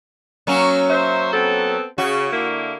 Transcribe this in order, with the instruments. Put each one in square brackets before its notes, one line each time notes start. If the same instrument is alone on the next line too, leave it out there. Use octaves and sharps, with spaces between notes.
[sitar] F#3 A#3 C#4
[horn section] C5 E5
B3 C4 A4
[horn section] C#3 [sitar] F#4
[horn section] D3 A#3 E4